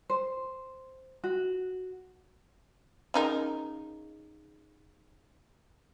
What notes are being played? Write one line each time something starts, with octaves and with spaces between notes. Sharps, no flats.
C5
F#4
C#3 D#4 A#4